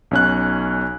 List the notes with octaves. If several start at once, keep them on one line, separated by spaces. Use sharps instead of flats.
B1 C#4 F#6